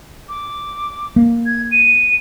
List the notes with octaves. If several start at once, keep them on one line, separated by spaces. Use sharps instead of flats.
D6
A#3
G#6
D#7